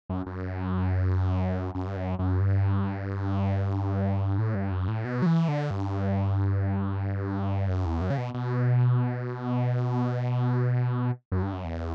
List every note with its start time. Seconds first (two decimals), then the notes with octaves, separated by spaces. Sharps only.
0.09 F#2
0.26 F#2
1.75 F#2
1.87 G2
1.96 F#2
2.19 F#2
2.40 G2
4.39 A2
4.55 G2
4.71 F#2
4.88 A2
5.05 B2
5.22 F#3
5.26 E3
5.48 D3
5.70 G2
7.68 F#2
7.85 E2
8.01 F#2
8.10 C#3
8.18 B2
8.34 B2
11.32 F#2
11.42 G2
11.53 F#2
11.64 E2